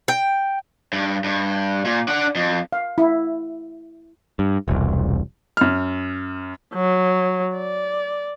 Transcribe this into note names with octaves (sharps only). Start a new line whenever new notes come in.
G5
G2
G2
A#2
D4 F#5
F2
F5
E4
G2
E1 C2
F#2 F6
F#3
D5